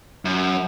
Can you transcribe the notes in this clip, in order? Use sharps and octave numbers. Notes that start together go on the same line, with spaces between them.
F#2